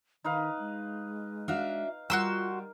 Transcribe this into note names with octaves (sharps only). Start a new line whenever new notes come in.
D#3 D#4 B4 F5
G#3
D4 F#4 E5 F5
G3 F4 F#4 A#4 C6 E6